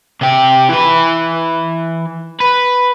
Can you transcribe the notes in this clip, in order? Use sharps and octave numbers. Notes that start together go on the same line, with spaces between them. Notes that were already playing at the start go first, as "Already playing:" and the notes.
C3 G4
E3 B4
B4